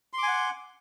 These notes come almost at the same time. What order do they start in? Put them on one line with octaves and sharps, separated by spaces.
C6 D6 G#5 F#5